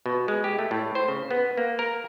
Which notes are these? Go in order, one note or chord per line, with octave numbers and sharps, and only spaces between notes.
B2
G#3
G4
A3
A2
C5
C#3
B3
A#3
A#4